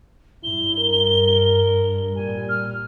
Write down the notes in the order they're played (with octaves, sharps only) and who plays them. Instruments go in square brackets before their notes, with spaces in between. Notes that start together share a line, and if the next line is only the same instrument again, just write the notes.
[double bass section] G2 [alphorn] E4 [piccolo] G7
[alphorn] A#4
[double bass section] A#2 [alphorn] G3 [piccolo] G#5
[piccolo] F6